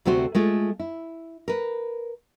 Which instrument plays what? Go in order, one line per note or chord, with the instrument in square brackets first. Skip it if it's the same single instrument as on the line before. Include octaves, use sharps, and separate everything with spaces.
[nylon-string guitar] D2 C3 A3 F#4 C5
G#3 A3 F4
E4
A#4 B4